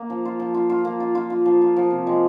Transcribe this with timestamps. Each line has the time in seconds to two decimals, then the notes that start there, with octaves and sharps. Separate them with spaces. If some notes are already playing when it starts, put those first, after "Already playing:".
Already playing: A#3
0.10 F3
0.25 F4
0.40 F3
0.54 F4
0.70 F4
0.85 A#3
1.00 F4
1.15 F4
1.30 F4
1.46 F3
1.61 F4
1.76 F3
1.91 C3
2.07 G#3